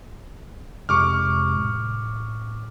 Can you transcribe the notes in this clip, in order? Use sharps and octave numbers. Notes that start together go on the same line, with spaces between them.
F2 C3 G#3 C#6 D6 F6
A2